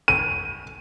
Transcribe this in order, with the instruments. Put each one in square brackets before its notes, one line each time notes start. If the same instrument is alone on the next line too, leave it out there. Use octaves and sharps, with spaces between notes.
[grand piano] D#7